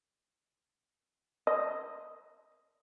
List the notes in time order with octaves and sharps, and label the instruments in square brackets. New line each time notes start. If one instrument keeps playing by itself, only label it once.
[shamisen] D#5